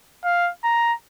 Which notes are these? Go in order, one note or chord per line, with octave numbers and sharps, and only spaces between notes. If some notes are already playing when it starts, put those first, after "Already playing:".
F5
A#5